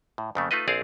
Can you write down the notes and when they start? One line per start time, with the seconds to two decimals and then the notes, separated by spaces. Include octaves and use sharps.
0.18 A2
0.35 F2 C#3 A3 A#3
0.51 A3 D#4 F4 B4 D#5
0.68 A#1 C4 G#4 A4 D5 F5